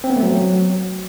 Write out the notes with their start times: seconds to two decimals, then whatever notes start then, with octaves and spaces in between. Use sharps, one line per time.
0.04 C4
0.10 B3
0.16 A3
0.23 F#3